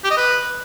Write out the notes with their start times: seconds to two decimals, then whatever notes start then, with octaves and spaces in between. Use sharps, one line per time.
0.04 G4
0.11 D#5
0.17 B4